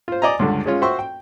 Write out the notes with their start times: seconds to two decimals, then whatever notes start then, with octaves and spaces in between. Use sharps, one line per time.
0.08 F4 C5
0.22 D5 D#5 G#5 A#5
0.39 C#2 G2 D3
0.66 G#3 C#4 F4
0.82 F#4 C5 E5 G5 C6 C#6
0.99 G5